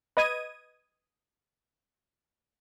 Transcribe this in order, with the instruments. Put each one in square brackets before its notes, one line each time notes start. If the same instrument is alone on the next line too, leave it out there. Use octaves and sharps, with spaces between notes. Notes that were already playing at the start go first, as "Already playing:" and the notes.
[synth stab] B4 D#5 D#6 G#6 D#7